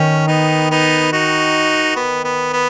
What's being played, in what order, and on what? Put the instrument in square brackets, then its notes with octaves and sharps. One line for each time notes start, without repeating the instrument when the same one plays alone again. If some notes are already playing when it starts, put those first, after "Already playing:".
Already playing: [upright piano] D#3 [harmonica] C#4
[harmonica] B3 D#4
B3 D#4
D#4 F#4
B3
B3
B3